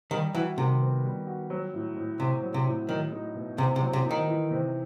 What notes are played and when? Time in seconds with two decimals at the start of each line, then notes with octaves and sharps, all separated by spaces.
0.11 D#3 G3
0.35 E3 F#4
0.57 C3 D#3
0.81 B3
1.03 G3
1.27 F#4
1.50 F#3
1.74 A2
1.96 A2
2.19 C3 C4
2.43 F#3
2.54 C3
2.66 A2
2.89 D#3 F#3
3.12 D#4
3.35 B2
3.58 C3 C4
3.76 C3
3.81 F#3
3.93 C3
4.05 D#4
4.11 D#3
4.28 E3
4.51 C3